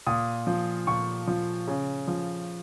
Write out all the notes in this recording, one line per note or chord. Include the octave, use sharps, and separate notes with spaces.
A#2 D#6
F3
A#2 C#6
F3
C#3
F3